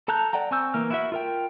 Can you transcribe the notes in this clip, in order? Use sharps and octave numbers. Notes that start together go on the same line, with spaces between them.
A4 A5 A#5 F#6 G6
D5 F#5 G5 A#5
C4 G#5 C#6 E6 G6
E3 A#3 F6
E4 F#4 E5
F4 A#4 G5